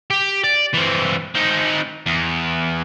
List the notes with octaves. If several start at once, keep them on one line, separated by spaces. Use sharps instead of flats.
G4
D5
E3 C4
C4 D#4
E2